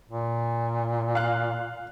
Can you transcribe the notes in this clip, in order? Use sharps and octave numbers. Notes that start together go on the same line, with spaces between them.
A#2
F5 F#6